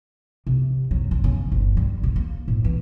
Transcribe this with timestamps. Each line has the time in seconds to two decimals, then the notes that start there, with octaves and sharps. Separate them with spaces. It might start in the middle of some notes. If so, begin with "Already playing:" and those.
0.47 C3
0.91 F#3
1.11 D3
1.24 C#3
1.52 G1
1.77 G3
2.03 C#3
2.16 A#3
2.48 A2
2.64 E3